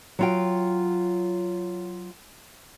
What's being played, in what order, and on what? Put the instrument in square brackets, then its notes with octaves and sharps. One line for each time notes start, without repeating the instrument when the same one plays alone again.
[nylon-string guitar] F#3 F4 G5